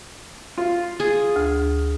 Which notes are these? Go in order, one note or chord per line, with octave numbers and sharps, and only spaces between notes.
F4
G#4
D2